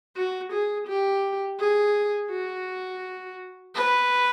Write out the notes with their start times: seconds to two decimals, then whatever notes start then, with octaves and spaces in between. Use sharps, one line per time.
0.16 F#4
0.53 G#4
0.87 G4
1.59 G#4
2.31 F#4
3.75 B4